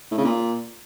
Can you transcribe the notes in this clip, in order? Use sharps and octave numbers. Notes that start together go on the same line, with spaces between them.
A2
C#3
A#2